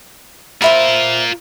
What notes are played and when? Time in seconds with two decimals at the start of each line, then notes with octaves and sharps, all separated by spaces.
0.62 F4 A#4 C5 E5 B5